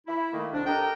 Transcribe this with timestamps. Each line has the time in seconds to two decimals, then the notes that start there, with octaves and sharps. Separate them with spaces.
0.07 E4
0.33 D#3 A3 A#3
0.53 C2 D4
0.66 G4 A4 A#4 D#5 G5